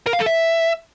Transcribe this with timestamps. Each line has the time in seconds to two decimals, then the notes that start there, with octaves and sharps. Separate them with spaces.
0.07 A#4
0.13 F5
0.20 A4
0.26 E5